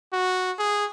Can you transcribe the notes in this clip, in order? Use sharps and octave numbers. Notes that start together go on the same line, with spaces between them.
F#4
G#4